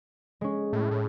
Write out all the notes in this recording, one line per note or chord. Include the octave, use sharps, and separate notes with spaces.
G#3 C#4
A2
A2